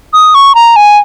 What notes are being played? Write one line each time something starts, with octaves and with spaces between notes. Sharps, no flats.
D#6
C#6
A#5
G#5